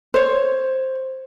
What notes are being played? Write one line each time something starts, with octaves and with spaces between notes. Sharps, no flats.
C5 C#5